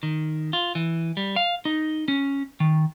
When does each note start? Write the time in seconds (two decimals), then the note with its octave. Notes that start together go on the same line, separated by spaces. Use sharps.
0.03 D#3
0.53 F4
0.75 E3
1.17 G3
1.36 F5
1.65 D#4
2.08 C#4
2.60 D#3